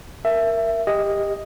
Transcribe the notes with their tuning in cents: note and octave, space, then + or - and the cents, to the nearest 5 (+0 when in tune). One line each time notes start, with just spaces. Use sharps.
A#4 +0 E5 +15
G4 +25 D#5 +0